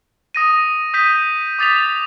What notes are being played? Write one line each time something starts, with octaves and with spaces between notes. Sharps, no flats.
D#6 A#6 D#7
D#6 G6 B6 D#7
D6 D#6 A6 B6 F7